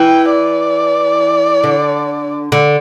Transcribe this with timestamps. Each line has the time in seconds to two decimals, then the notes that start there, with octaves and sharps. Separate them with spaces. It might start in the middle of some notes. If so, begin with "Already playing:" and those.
Already playing: E3 G5
0.31 D5
1.64 D3
2.52 D3